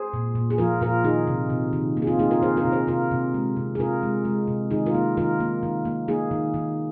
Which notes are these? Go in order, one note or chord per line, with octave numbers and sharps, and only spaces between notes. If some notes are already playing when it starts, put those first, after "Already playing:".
Already playing: G#4 C5
A#2
A#2
G#4
F3 F4 A#4
A#2 F4 A#4
D#3 D#4 G#4
C3
C3
D#3
A#3
G#4
C4 F4
A#3 D#4 G#4
F4 A#4
D#3 G#4 C5
F4 A#4
C3
G#4 C5
C3 F4 A#4
C3
G#3
C3
G#4
C3 F4 A#4
G#3
G#3
C3
D#3 D#4 G#4
F4 A#4
A#3
D#3 F4 A#4
A#3
D#3
A#3
A#3 D#4 G#4
D#3
D#3